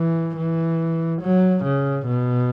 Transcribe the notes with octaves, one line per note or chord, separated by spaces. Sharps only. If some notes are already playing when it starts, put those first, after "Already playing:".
Already playing: E3
E3
F#3
C#3
B2